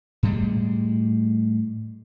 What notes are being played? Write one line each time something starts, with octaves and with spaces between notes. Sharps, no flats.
A2 G3 G#3